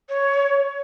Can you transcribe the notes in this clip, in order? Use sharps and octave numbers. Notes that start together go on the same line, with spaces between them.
C#5